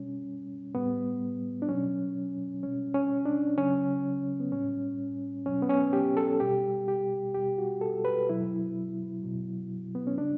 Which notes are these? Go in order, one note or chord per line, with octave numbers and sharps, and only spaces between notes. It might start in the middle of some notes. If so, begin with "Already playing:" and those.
Already playing: B2 G3 C#4
A2 G3 B3
D4
B2 F#3 C#4
B2 G3 C#4
C#4
D4
C#3 F#3 C#4
B3
A2 G3 C#4
B2 F#3 C#4
B3
C#4
G4
A4
B2 G3 G4
G4
B2 G3 G4
F#4
A4
B4
B2 F#3 E4
B2 F#3
B3
C#4
C#3 G3 D4